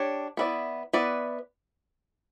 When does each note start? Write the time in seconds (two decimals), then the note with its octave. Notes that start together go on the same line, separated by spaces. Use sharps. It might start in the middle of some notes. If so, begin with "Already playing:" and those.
Already playing: D4 G4 C#5
0.37 B3 E4 B4 D5
0.93 B3 E4 B4 D5